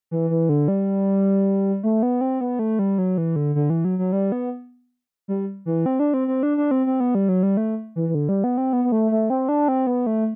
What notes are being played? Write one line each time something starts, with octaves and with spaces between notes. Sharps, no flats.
E3
E3
D3
G3
A3
B3
C4
B3
A3
G3
F#3
E3
D3
D3
E3
F#3
F#3
G3
B3
G3
E3
C4
D4
C4
C4
D4
D4
C4
C4
B3
G3
F#3
G3
A3
E3
E3
D3
G3
B3
C4
B3
B3
A3
A3
C4
D4
C4
B3
A3